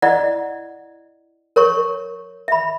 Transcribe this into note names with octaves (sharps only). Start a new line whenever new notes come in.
E4 D5 D#5 F#5
A#4 C#5 C#6
E5 B5